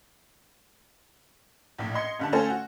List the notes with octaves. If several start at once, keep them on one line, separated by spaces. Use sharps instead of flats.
A#1 A2
D#5 C6 G#6 C#7
G2 D3 A5
A3 C#4 F4 A4 C5 G#5
F#4